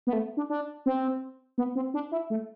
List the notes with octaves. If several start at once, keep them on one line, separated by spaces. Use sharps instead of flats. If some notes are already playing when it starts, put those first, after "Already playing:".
B3
A3
D4
D4
C4
B3
C4
D4
E4
A3